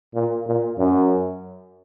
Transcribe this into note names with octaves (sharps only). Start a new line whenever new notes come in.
A#2
A#2
F#2